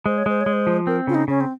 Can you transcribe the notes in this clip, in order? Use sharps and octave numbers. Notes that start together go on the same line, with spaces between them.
G#3 C5
C#5
G#3 C5
C#5
G#3
C5
F3
C4 A#4
C#3 F4
D#4
C#3 C#4
C4